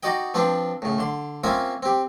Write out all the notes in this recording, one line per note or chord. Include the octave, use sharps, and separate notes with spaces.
D#4 F#4 D5 D#5 G5
F3 C4 D4 B4 C5
A2 C#3
D3 C6
A#3 C4 C#4 F4 E5 D#6
C4 G4